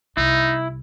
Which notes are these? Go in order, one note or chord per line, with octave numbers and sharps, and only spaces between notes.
C2 D#4 E4